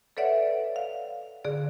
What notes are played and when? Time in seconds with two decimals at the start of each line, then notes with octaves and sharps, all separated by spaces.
0.17 A4 B4 C#5 D5 E5 F#5
0.76 F5
1.45 D3 G#4 D5